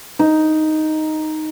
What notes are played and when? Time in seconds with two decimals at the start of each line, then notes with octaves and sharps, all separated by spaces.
0.19 D#4